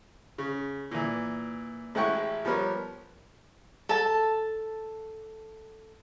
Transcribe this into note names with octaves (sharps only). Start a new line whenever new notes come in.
C#3
A#2 E3
A1 G#3 E4 F#5 G5 C#6
F3 G3 B3 A#4 C#5
A4 A5